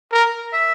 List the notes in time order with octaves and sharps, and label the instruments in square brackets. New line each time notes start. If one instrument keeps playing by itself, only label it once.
[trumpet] A#4
[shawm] E5